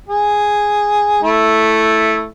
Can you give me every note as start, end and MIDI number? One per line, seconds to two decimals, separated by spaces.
0.09 1.20 68
1.23 2.26 57
1.23 2.26 64